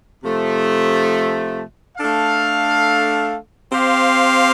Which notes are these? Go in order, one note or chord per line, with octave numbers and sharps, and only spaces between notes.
C3 F3 A3
A3 D4 A4 F5
C4 G4 C5 F5